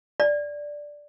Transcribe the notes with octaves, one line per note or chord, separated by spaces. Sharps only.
D5